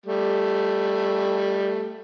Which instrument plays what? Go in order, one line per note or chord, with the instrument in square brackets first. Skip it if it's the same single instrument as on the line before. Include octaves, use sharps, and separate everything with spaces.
[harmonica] G3 A3